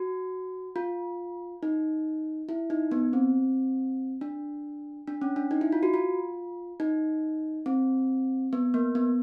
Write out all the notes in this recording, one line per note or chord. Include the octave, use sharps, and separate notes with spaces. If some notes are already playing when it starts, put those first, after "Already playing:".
Already playing: F#4
F4
D#4
E4
D#4
B3
C4
D4
D4
C#4
D4
D#4
E4
F4
F#4
F4
D#4
C4
B3
A#3
B3